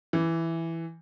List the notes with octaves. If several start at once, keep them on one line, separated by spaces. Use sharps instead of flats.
E3